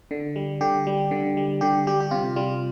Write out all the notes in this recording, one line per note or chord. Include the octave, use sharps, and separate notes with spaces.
D3
G3
D3 G4
G3
D3
G3
D3 G4
G3 G4
G4
C3 F4
G3 F4